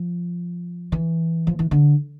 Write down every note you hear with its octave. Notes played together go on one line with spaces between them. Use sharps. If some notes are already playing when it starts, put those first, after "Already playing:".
Already playing: F3
E3
F3
E3
D3